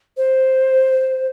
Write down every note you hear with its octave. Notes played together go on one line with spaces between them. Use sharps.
C5